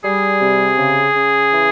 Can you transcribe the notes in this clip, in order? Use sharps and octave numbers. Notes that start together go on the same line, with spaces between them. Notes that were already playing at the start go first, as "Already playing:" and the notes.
G3 G#4
C3
C#3
C#3
E3